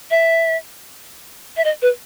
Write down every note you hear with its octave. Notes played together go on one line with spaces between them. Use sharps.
E5
E5
D#5
B4